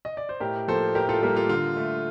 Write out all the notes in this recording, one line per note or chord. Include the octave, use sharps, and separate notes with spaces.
D#5
D5
C5
A2 G4 A#4
F3 A#3 A4 C5
A2 G4 A#4
F4 A4
G3 A#3 G4 A#4
F4 A4
D3 F4
A3